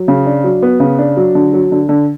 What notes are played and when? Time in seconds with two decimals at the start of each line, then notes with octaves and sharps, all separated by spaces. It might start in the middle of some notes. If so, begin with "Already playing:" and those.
Already playing: F#3
0.08 C#3
0.26 D4
0.44 F#3
0.62 B3
0.80 C#3
0.98 D4
1.17 F#3
1.35 D3
1.53 F#3
1.72 D3
1.89 D3